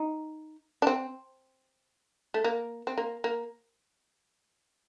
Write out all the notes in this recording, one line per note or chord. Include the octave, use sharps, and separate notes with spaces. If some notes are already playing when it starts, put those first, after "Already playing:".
Already playing: D#4
D4
C4
A3
A#3
C4
A#3
A#3